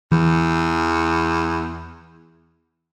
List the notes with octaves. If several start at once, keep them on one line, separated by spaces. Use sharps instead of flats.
E2 E3